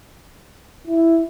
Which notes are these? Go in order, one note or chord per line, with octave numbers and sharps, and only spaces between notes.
E4